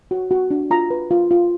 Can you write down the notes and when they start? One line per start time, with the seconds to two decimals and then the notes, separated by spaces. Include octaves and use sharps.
0.11 F#4
0.31 F#4
0.51 D4
0.71 F4 A#5
0.91 B4
1.11 F4
1.31 F4